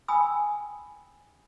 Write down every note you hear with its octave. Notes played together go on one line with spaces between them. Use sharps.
G5 G#5 B5 D#6 E6